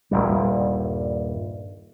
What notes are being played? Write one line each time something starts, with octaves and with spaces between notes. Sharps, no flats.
D#1 C2 G2 G3